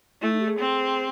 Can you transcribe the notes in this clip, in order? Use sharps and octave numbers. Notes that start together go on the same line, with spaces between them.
A3 E4
D#4
G4
G#4
C4